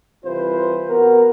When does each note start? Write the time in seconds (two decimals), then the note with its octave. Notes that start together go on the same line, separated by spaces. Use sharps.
0.25 C2 E3 F4 B4 C5
0.89 B3 F#4 A#4